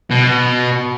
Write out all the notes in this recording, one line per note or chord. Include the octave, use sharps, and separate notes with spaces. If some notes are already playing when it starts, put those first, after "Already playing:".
B2